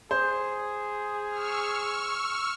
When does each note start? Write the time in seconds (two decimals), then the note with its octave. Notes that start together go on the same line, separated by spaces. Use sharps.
0.11 G#4 C5
1.30 C#6 E6 F6